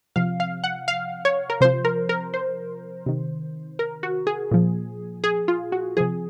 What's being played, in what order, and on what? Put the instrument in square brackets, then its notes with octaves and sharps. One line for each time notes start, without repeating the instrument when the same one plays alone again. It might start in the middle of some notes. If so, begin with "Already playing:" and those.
[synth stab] C3 F3 F5
F5
F#5
F5
C#5
A#4
C3 F3 C5
A#4
A#4
C5
C3 D#3
A#4
F#4
G#4
A#2 F3
G#4
F4
F#4
C3 F3 G#4